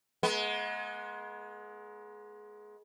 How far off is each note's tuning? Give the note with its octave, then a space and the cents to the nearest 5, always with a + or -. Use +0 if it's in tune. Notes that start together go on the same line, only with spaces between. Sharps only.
G#3 +20 B3 -35